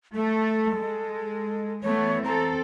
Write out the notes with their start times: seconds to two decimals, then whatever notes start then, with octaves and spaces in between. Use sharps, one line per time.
0.15 A3 A4
0.78 G#3
1.83 E3 A3 B3 C#5
2.25 C4 A4 A#5